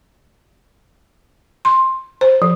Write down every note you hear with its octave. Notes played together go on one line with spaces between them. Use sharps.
C6
C5
F3